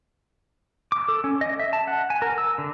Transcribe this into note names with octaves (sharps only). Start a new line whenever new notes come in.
D6
A4
C#4
D#5
E5
A5
F#5
G#5
A#4
E6
D3